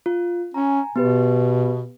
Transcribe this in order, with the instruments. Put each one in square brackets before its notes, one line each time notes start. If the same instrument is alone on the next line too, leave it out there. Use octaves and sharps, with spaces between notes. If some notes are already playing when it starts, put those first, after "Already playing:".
[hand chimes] F4
[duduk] C#4 [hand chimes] G#5 A#5
[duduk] B2 [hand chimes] B3 G4 B4